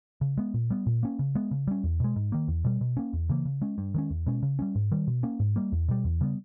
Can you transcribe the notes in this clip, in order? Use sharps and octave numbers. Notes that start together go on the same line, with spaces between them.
C#3
G#3 B3
A#2
G3 B3
A#2
A#3 C#4
C#3
G#3 B3
C#3
G3 C#4
E2
B2 G#3
G#2
D#3 A#3
E2
B2 G3
B2
A#3 C#4
E2
C#3 E3 A#3
C#3
G#3 C#4
G2
D#3 G#3 C#4
E2
B2 G#3 C#4
C#3
G3 A#3 C#4
G#2
D#3 G3
B2
A#3 C#4
G#2
G3 A#3
E2
B2 G3
E2
C#3 G3 B3